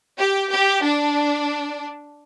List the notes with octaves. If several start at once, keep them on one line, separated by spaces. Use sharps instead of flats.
G4
G4
D4